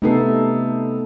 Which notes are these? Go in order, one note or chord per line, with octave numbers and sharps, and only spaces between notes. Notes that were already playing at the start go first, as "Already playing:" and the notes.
C3 A3 B3 D#4 A4 C7